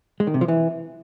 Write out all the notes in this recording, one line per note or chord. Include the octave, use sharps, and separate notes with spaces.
G#3
D#3
C3
F3
E3